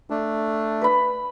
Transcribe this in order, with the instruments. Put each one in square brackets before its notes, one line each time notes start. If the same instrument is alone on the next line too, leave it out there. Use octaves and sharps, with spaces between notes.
[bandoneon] A3 D4
[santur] B4 B5